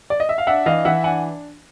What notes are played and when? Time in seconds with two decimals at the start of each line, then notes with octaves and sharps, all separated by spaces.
0.10 D5
0.20 D#5
0.29 E5
0.38 F5
0.47 D4 E5 F#5
0.66 E3 D#5 F5
0.85 E3 E5 F#5
1.04 D4 F#5 G#5